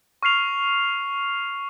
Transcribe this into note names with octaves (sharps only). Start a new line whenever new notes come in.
C#6 F6 C7 F7